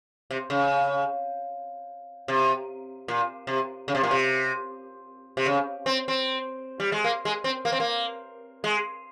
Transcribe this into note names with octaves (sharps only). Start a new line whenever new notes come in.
C3
C#3
C3
A#2
C3
C#3
C3
A#2
C3
C3
C#3
C4
C4
G3
G#3
A#3
G#3
C4
A#3
C4
A#3
G#3